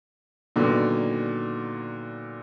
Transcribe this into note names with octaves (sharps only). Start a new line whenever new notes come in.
A#2 D3 D#3 F#3 B3